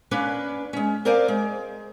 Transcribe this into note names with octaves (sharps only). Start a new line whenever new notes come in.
A#3 C#4 D4 B4
G#3 C#4
C4 A#4 C5 D5 F5 G#5
G#3